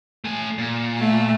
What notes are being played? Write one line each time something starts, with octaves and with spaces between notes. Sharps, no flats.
A3 G#5
A#2
A3